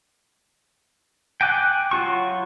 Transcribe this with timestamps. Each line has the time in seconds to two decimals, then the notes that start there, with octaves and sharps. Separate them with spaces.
1.41 G5 G#5 D6 F#6
1.91 F#3 F4 F#4 C#6